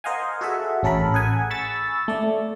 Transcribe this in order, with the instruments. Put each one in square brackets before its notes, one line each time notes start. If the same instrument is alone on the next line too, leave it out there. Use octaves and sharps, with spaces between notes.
[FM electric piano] A#4 C5 D#5 F5 F#5 G#5
F#4 G#4 A4 E5 F#5
A1 C#4 A4 A#4 B5
G#4 F#5 G#5
B5 C#6 E6 A6
A3 D5